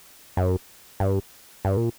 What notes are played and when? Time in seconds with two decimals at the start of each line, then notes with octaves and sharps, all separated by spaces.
0.37 F#2
1.00 G2
1.65 G2
1.77 A#2